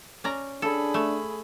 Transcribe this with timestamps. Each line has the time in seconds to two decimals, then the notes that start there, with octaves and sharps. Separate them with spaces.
0.24 C#4 D5 A#5
0.62 D4 G#4 A4 B5
0.94 A3